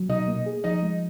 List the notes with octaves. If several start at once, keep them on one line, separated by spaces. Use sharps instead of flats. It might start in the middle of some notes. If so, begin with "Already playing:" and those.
Already playing: F#3
B2 D#4 D#5
A#3
G#4
F3 D#4 D#5
G#3